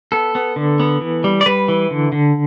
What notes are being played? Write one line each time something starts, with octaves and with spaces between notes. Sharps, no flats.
B3 A4
B3
D3
B3
E3
G3
D5
G3 B4
E3
D3
D3